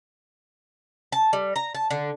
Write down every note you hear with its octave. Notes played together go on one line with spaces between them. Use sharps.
A5
G3
A#5
A5
D3